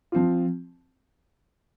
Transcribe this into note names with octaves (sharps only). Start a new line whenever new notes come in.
F3 C4 F4